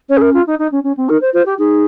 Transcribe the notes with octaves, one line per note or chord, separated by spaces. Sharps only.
C#4 C#5
G#4
A#4
F4
D#4
D#4
C#4
C#4
C4
D#4 A#4
C5
F4 C5
G4
D#4 G#4